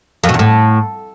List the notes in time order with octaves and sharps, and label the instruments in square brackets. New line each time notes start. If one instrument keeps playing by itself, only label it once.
[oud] F2
B2
E2
A2